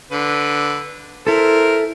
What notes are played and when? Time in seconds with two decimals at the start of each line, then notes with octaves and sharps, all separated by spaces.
0.12 D3 B4
1.27 E4 A4 A#4 C5